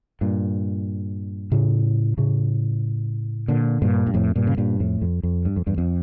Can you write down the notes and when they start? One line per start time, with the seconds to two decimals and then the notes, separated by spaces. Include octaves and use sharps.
0.21 G2 A#2
1.52 A2 C#3
2.17 A2 C#3
3.48 A#2 D3
3.82 G2 A#2
4.07 G2
4.14 F2 A2
4.36 G2 A#2
4.47 C#3
4.57 G2 A#2
4.80 F2 A2
5.02 F2
5.23 F2
5.45 G2
5.56 F2
5.66 E2 G2
5.78 F2